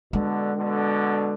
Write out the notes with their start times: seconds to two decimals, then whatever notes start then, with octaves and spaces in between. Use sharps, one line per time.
0.13 B2 D3 G#3
0.57 B2 D3